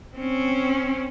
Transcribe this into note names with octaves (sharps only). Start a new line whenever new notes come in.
C4 C#4